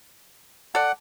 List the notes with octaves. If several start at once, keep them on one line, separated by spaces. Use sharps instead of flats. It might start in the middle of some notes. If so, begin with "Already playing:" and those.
A4 D5 F#5